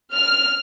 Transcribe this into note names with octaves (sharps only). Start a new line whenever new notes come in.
F6